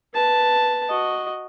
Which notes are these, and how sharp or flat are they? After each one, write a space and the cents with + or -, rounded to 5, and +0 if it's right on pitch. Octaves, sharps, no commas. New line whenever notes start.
B4 +0 A5 +0
F#4 +0 D#5 +0